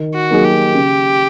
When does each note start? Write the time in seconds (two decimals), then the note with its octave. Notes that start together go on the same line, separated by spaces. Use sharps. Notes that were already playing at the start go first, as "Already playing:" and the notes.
Already playing: D#3
0.15 F#4
0.30 F#3 A#3 D#4 G#4
0.44 G4
0.74 C#3